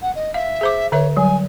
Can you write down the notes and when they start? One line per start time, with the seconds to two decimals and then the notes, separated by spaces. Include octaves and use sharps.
0.01 F#5
0.15 D#5
0.34 E5 F5
0.61 G#4 C5 D6
0.92 D3 B4 C#5 E5
1.17 F#3 G3 G#5